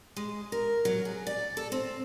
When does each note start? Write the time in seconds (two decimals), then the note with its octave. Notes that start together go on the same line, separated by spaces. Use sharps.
0.16 G#3
0.52 A#4
0.85 F#3
1.05 G#4
1.27 D5
1.57 A4
1.72 C4